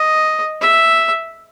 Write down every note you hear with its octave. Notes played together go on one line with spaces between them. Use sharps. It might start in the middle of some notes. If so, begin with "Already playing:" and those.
Already playing: D#5
E5